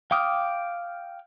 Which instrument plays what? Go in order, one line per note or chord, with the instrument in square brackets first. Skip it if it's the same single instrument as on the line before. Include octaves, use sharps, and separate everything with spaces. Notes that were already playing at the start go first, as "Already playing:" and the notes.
[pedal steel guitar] F5 G5 D6 D#6 F6